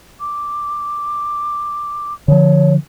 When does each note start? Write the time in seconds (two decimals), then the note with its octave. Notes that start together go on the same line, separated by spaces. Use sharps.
0.20 D6
2.28 D3 F3 C#5